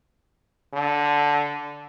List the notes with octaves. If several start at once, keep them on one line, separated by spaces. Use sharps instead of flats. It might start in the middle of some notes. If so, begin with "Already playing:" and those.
D3